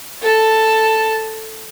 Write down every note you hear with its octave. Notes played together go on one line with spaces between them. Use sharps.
A4 A5